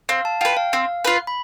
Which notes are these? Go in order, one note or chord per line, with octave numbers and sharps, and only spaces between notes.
C4 F5
A5
F4 B4 G5
F5
C4 F5
F4 B4
B5